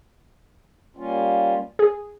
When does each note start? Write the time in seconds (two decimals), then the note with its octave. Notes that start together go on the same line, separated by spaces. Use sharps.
0.96 G3 A#3 C#4 F4
1.79 G#4